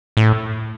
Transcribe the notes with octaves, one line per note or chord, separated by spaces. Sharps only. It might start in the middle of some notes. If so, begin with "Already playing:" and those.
A2